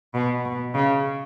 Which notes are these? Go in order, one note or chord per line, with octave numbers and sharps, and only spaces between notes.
B2
B2
C#3